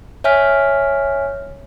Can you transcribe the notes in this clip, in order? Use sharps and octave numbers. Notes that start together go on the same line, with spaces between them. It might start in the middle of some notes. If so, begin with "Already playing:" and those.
C#5 E5 G#5 F6 B6